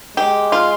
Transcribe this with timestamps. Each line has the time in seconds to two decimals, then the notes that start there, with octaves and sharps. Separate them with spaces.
0.17 G#3 G4
0.52 F4